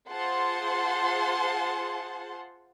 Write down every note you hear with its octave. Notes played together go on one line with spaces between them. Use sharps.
F4 G#4 C5 F#5 A5 C6